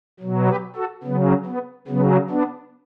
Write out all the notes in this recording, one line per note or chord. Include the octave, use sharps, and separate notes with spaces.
B2 F#3
G4 B4
F#4 A4
C#3 F#3 B3
B3
C#3 F#3 B3
B3 D4